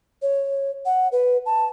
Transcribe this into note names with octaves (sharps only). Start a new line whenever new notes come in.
C#5
F#5
B4
A5